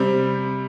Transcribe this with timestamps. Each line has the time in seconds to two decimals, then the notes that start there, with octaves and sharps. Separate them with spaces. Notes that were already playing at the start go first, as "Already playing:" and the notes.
Already playing: C3 G3 C4